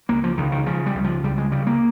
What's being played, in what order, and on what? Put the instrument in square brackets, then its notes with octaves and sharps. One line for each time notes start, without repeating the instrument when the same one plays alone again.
[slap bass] C#2 A#3
F3
C#2 D#3
D#3
C#3 F3
G3
C#2
F3
C#2 G3
G#3
C#3 G3
A#3